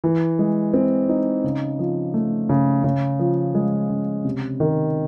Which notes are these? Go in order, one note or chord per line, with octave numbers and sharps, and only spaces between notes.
E3
G#3
C4
D#4
C#3
F3
A3
C#3
C#3
F3
G#3
C#3
C3
D#3